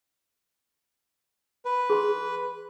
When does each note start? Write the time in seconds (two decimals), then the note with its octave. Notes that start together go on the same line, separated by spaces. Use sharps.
1.65 B4
1.90 G#4 C6